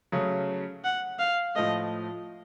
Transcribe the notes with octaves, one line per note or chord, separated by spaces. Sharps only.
C#3 F#3 A3 C#4
F#5
F5
A2 F3 A3 D#5